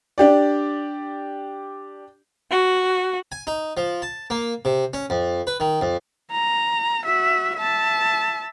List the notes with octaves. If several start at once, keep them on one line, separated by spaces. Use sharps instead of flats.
D4 G4 D5
F#4
G#5
D#4
F3
A5
A#3
C3
C#4
F2
B4
D#3
F2
A#5
F#4 E5
E5 A5